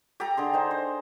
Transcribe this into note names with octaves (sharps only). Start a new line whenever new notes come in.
G4 A4 G5 A#5
D3 G#4 C6
D#4 C5
C5